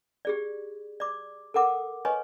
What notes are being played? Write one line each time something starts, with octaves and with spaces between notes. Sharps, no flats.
G4 G#4 D5
D5 D6
A4 A#4 F#5 D6
B4 C#5 D#5 G#5 C#6